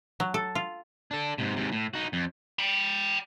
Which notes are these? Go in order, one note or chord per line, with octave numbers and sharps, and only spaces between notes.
F#3
A4
F4
D4 A4
G#2 C3
G#2 C3
A2
D#4 F#4
F2
G5 B5